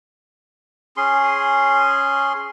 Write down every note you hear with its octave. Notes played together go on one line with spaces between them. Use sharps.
C#4 G#4 C6